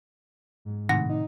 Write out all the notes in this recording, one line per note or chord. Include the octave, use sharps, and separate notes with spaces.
G#2
A2 C3 D#3 F#5 A#6
D#4